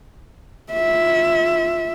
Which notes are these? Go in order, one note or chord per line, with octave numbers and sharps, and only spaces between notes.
F4 E5